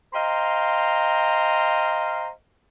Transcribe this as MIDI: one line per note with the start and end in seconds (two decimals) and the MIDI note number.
0.14 2.29 72
0.14 2.29 75
0.14 2.29 77
0.14 2.29 79
0.14 2.29 82